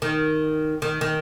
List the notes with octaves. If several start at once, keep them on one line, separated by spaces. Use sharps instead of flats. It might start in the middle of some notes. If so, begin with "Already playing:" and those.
D#3
D#3
D#3